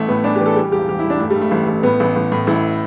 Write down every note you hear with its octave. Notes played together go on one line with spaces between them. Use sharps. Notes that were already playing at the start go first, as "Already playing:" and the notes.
Already playing: A1 A3
A2 B3
E3 D4
G4
E3 A4
G3 G4
E1 G4
E1 G4
E4
E1
D4
G2 A3
G3
G2
A3
A1
A1
A2 B3
A1
A1
A2
A1 E4